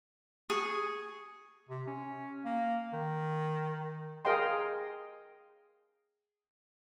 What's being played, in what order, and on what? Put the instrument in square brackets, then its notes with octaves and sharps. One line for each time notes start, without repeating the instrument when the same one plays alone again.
[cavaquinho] G#4 [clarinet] C#6
[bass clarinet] C3
C#4
A#3
D#3
[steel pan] G#4 A#4 D#5 F5 G5 C6